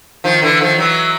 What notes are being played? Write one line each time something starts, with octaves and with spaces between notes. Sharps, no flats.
D#3 F3
D3 E3
D#3 F3
E3 F#3